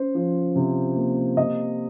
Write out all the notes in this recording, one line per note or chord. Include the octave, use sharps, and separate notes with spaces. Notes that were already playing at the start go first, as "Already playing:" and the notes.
Already playing: C#4 C5
F3
C3
A#3
C3 D#5